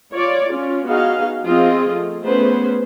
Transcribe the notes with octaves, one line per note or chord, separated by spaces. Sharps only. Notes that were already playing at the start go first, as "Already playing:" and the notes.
F4 C#5 D5
C#4 F4
B3 D#4 F#4 G#4 D#5 F5
F3 C4 F4 G#4 D#5
A3
A3 B3 C#4 G#4 B4 C5